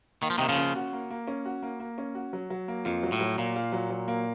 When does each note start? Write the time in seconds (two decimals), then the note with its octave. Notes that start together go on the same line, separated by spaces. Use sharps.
0.23 D#3 A#3
0.30 F3
0.38 C3 D#3 A#3
0.49 C#3 F3
0.58 C#4
0.75 F#4
0.93 A#3
1.10 A#3
1.27 C#4
1.45 F#4
1.63 A#3
1.80 A#3
1.98 C#4
2.15 F#4
2.33 F#3
2.50 F#3
2.68 A#3
2.85 F2 F4
3.03 F#3
3.12 A2
3.20 F#3
3.38 A#2 A#3
3.56 F4
3.73 F#3
3.90 F#3
4.08 A#3